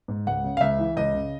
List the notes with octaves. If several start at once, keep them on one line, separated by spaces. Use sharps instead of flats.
G#2
C#2 F#5
C#3
F5
C#2 E5
E3
C#2 D#5
C#3